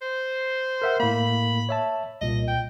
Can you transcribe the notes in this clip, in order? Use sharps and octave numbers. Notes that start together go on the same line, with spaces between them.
C5
A#4 E5 F#5
A2 A#3 B5
C#5 E5 A5
C2 A#2 D#5
G5